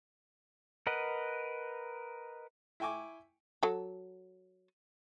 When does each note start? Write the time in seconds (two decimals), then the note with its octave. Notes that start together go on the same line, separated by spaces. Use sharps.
0.87 A#4 B4 D#5 F#5
2.80 E4 G5 G#5 C#6 D6
3.63 F#3 A4